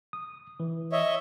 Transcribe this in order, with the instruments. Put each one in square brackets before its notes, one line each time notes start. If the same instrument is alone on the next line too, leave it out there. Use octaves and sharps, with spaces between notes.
[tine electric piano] D#6
E3
[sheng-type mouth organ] C#5 D#5 E5